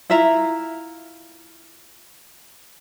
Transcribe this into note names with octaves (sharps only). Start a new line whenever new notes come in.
E4 F4 E5 A#5